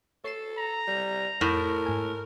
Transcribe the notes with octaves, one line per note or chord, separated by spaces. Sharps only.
A4 C#5 C7 E7
A#5
G3
F2 A2 A#4 G6
G#2 G#5